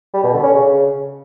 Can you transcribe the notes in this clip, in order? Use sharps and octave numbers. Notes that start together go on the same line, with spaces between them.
G3
B2
D3
C#4
C#3